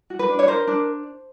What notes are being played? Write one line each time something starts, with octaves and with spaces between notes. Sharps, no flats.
F#4
B4
D4
C#5
A#4 C5
D4